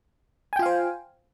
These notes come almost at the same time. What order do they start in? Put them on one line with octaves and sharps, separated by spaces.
G#5 G5 F4 F5 C5